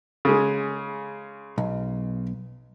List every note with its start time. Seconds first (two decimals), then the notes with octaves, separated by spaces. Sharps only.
0.25 C#3 G#3
1.58 B1